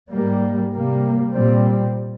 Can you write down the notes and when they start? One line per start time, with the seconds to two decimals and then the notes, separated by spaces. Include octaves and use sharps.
0.10 G#2 G3 A#3
0.72 C3 G3 A#3
1.34 A#2 G3 C4